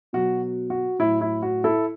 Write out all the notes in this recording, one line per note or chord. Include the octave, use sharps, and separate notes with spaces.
B2 F#3 F#4
F#4
A2 F#3 E4
E4
F#4
E4 A4